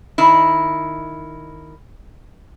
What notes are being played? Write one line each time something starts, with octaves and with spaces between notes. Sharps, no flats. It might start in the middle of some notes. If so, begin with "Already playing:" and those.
D#3 E4